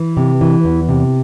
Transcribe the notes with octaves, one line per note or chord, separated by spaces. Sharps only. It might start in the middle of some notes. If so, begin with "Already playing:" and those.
Already playing: E3
C3
E3
E2
C3